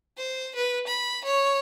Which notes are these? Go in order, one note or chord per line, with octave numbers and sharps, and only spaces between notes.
C5
B4
B5
C#5